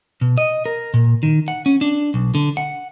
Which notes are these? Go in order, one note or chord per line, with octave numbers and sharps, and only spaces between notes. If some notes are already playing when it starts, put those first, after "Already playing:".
B2
D#5
A#4
A#2
D#3
F#5
C#4
D4
B1
D3
F#5